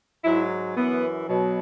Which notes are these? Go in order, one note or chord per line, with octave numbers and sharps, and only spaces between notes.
G#2 F#3 E4
F#2 E3 B3
B2 F#3